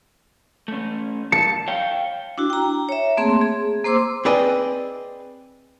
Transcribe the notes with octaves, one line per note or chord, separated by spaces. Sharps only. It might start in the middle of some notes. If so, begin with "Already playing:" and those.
A3 C#4
A5 C#7
C#5 F5 G5
D4 E4 F#4
G5 A#5
C#5 E5
A3 A#3 C4 G#4 C6
G#4
A#3 C5 C6 D6 E6
C4 G#4 B4 D5 D#5 G#5